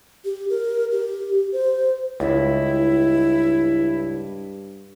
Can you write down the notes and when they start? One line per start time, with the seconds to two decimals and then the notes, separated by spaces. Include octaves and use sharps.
0.25 G4
0.50 A#4
0.92 G4
1.52 C5
2.20 C#2 G2 E4